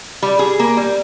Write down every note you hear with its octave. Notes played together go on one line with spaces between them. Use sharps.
G3
G#4
A#3
G3